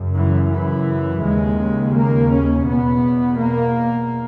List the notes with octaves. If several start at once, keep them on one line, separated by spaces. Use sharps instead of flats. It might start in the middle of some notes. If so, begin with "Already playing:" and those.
Already playing: F#2 C#3
E3
E3
D#2 C#3 G#3
A#3
C#4
E2 B2 B3
A#3